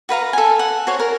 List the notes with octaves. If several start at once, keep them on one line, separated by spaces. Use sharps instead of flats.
F#4 B4 F5 A#5
A4 G#5
F#5
F#4 C5 C#5
A#4